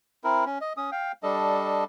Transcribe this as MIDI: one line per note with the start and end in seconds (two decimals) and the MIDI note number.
0.24 0.45 60
0.24 0.45 64
0.24 0.45 70
0.46 0.58 61
0.61 0.73 75
0.77 0.90 61
0.77 0.90 87
0.92 1.12 77
0.92 1.12 79
1.23 1.84 55
1.23 1.84 62
1.23 1.84 69
1.23 1.84 75